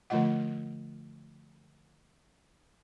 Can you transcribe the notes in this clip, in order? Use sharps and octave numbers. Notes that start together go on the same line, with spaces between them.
D3 F3 A3 F4 D#5 F#5